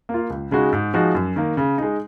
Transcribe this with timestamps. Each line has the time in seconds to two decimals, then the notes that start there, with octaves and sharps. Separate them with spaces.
0.09 A#3
0.14 F4
0.30 C#2
0.51 C#3 G#3 D#4 F#4
0.72 G#2
0.94 F3 G#3 D#4 F#4
1.15 F#2
1.36 D#3 A#3
1.57 C#3
1.78 G#3 D#4